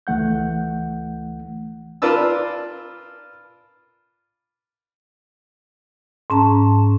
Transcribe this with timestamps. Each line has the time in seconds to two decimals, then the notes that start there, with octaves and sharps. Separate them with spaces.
0.07 C#2 E3 A3 F#5 G6
2.02 F4 A#4 B4 D5 A5 E6
6.30 G#2 C#4 A5 A#5